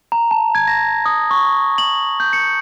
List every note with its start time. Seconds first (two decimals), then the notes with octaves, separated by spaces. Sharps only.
0.12 A#5
0.31 A5
0.55 G#6
0.67 A#6
1.06 D#6
1.31 C#6
1.78 F#7
2.20 G6
2.33 C#7